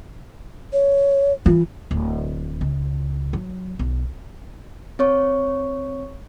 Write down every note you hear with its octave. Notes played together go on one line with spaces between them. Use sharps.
C#5
E3 F4
D1
C#2
F#3
B1
C4 C#5 C#6